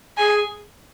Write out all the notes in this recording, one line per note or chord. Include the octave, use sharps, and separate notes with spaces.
G#4 G#5